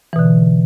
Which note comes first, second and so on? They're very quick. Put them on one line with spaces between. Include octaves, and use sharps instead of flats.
E3 B2 D3